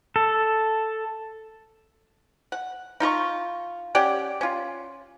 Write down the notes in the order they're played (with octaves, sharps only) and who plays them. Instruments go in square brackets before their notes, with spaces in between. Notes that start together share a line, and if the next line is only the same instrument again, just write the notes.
[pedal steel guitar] A4
[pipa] F#5
D#4 F4 A#5 C#6
C#4 G4 D5 F#5
C#4 F4